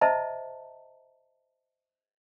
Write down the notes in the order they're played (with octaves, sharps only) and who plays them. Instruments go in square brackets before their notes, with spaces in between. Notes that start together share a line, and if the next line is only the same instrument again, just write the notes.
[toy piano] C5 D#5 E5 A5 A#5